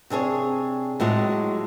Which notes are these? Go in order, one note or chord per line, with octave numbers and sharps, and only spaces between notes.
C3 D4 G#4 C#5
A2 F#3 G#3 F#4